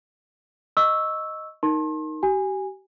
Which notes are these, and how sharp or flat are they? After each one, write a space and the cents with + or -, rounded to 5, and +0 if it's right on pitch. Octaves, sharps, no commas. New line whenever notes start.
D#5 +0 C#6 +0 E6 -5
D#4 +0 A#4 +0 C6 +35
G4 -35 G#5 -15